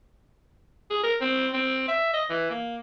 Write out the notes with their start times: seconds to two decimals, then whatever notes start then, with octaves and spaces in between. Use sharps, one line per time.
0.90 G#4
1.04 A#4
1.21 C4
1.54 C4
1.88 E5
2.14 D#5
2.30 E3
2.51 A#3